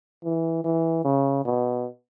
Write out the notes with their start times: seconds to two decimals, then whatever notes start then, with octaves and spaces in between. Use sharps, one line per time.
0.24 E3
0.64 E3
1.05 C#3
1.45 B2